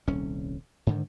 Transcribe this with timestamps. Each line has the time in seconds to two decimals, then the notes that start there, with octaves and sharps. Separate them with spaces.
0.07 D#1 C2 C#4
0.87 G#2 D3 D#3